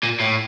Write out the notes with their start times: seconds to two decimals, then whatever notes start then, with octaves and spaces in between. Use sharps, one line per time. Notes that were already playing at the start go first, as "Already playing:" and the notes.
0.04 A#2
0.20 A2